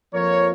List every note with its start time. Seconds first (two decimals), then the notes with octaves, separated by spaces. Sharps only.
0.13 F2 F3 A#3 A#4 C#5